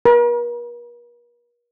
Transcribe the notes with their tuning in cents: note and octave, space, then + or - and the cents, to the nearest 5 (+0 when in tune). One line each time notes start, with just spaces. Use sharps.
A#4 +45